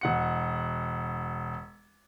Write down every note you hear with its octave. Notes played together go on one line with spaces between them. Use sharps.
E1 F#5 C#7